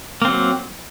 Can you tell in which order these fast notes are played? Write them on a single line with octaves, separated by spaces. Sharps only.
A#3 C4 F#3